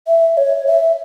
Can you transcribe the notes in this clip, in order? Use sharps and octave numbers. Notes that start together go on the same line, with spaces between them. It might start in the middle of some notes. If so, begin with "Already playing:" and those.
E5
C#5
E5